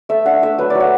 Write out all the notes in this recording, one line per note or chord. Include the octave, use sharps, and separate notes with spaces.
A3 E5
D4 F#5
A3 E5
F#3 B4
F#3 D5
F#5